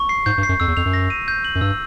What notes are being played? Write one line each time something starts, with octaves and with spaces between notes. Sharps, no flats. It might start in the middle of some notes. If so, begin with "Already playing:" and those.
Already playing: C#6
C7
G#2 G6
G2
C7
F#2
F2 E6
E2
F2 F7
F#2
A#6
D#7
G6
F#7
F#2
G2 E6